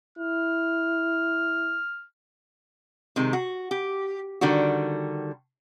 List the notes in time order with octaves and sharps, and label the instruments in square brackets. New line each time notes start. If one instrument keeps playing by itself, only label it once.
[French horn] E4 [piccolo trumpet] F6
[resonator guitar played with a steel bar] C3 D#3 G#3
F#4
G4
D3 D#3 G3 F#4